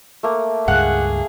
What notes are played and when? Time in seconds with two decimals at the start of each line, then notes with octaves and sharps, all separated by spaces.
0.23 A3 A#3
0.68 C#2 G2 G#4 F5 F#5